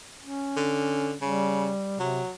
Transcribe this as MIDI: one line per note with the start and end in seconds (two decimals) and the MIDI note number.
0.21 1.17 61
0.57 1.13 50
1.21 1.72 49
1.21 1.99 55
2.00 2.21 48
2.00 2.31 54